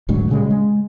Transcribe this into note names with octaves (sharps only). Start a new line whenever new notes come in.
D#1 D2 G#2 F#3
A#2 C#3 G3 G#3
G#3